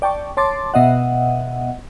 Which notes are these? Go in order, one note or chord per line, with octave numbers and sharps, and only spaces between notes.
D5 G5 A5 C#6
C#5 A5 C6 D6 A6
B2 B3 D#5 E5 F#5